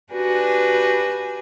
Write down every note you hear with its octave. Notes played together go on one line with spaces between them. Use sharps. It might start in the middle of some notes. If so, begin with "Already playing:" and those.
D4 F#4 G4 B4 G#5